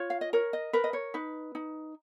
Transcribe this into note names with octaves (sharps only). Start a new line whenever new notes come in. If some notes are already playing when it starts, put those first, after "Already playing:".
Already playing: F4 C#5
F5
D#5
A#4 C#5
D#5
A#4 B4
D#5
C#5
D#4 B4
D#4